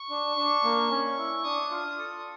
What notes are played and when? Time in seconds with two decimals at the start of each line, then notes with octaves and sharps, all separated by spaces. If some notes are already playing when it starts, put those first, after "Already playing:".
Already playing: C#6
0.10 D4
0.37 D4
0.64 A#3
0.90 C#4
1.17 E4
1.44 D4 D#6
1.71 F4
1.98 A4